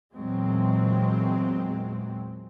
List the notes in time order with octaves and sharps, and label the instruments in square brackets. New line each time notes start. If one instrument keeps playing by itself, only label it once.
[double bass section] E2 A#2 F#3 G#3 C4